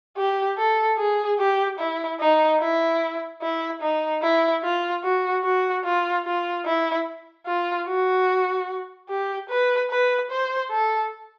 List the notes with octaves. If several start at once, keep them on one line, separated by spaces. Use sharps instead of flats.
G4
A4
G#4
G4
E4
D#4
E4
E4
D#4
E4
F4
F#4
F#4
F4
F4
E4
F4
F#4
G4
B4
B4
C5
A4